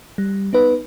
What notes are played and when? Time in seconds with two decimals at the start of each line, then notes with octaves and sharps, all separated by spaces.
0.18 G3
0.53 B3 D#4 B4